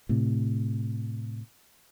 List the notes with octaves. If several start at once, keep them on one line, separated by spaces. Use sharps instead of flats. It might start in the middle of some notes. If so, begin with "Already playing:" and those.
A2 C3